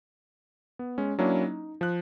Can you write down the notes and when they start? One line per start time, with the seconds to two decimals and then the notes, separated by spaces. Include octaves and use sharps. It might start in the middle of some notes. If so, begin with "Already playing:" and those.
0.79 B3
0.98 G#3 C#4
1.19 F#3 A#3 C#4 D4 E4
1.43 D#4
1.81 F3 F#6